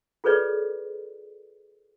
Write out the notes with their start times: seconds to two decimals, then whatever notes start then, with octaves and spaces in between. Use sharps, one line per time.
0.24 F4 G#4 A4 B4 C#5 D5